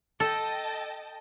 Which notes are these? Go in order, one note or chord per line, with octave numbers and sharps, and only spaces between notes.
A4 D#5 G5 A5